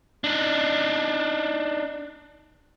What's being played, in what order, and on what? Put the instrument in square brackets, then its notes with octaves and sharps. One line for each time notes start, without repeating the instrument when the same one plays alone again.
[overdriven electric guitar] D4 D#4